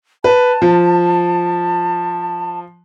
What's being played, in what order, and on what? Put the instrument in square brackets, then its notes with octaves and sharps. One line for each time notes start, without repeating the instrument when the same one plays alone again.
[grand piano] B4 [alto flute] A5
[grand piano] F3